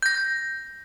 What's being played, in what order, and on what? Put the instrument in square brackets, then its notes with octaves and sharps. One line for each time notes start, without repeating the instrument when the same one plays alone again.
[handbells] G6 A#6